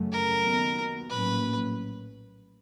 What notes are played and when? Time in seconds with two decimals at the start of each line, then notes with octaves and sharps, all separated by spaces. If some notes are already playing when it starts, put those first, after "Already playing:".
Already playing: F#2 C#3 F#3 A3 C#4
0.12 A#4
0.45 D#2 D#3 F#3 B3
1.10 A#1 A2 F#3 A#3 C#4 B4